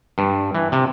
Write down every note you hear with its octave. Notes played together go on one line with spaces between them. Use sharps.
G2
E3
C3